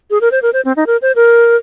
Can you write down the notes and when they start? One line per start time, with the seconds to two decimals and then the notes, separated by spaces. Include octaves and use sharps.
0.10 G#4
0.21 A#4
0.32 C5
0.42 A#4
0.53 C5
0.65 C4
0.76 D#4
0.87 A#4
1.02 C5
1.16 A#4